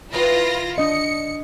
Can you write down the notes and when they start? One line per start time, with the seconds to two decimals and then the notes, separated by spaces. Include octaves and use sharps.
0.13 D#3 E4 F4 B4 A#6
0.78 D4 D#5 C#7